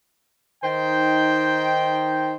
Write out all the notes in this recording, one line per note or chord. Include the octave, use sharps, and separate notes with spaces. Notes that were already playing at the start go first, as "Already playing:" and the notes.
D#3 D#4 C5 G5